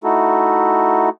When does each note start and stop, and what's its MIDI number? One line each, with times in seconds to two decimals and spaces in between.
0.04 1.09 57
0.04 1.09 63
0.04 1.09 64
0.04 1.09 66
0.04 1.09 69